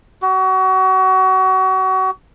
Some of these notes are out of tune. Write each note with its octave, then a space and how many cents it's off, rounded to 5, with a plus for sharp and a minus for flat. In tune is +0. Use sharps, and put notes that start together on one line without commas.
F#4 +30